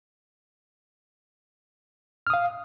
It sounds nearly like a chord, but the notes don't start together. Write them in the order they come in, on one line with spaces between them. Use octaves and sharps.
F6 D#6 F5